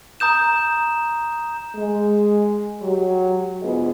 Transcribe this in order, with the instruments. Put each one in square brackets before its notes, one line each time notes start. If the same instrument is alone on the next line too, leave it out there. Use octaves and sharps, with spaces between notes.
[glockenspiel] A#5 D#6 G6 E7
[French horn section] G#3
F#3 G4
D2 G#2 B3 F4 G#4 D#5